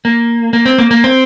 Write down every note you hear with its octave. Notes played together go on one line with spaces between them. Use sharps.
A#3
A#3
C4
A#3
A#3
C4